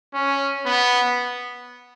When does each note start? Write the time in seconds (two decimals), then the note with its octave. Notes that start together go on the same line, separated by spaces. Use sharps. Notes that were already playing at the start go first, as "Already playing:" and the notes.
0.14 C#4
0.66 B3